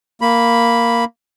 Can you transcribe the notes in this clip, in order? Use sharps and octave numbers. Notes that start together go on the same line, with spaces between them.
A#3 B5